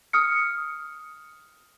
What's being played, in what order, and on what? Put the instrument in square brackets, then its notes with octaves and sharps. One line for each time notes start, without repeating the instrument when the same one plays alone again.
[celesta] D#6 F6 C#7